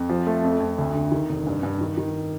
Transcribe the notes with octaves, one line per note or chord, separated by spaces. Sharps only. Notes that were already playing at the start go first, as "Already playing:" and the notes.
Already playing: F2
F3
A3
F2
F2
D2
D3
D#3
F1
G2
G2
D#3
D#3